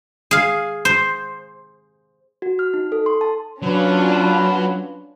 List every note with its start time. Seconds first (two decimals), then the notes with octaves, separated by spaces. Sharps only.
0.31 G#4 F5
0.85 C5
2.42 F#4
2.59 F6
2.74 D#4
2.92 A4
3.06 C6
3.21 A5
3.62 F#3 A#3 C#4 D4 F4 B4